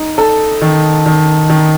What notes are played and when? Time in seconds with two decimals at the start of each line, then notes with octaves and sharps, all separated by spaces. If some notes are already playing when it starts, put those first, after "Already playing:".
Already playing: D#4
0.18 A4
0.62 D#3
1.06 D#3
1.50 D#3